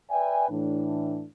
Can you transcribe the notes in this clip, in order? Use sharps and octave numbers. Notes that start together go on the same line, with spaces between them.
B4 D5 E5 G5 G#5
A2 E3 D4